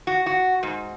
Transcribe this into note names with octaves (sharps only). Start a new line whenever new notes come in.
F#4
F#4
G#2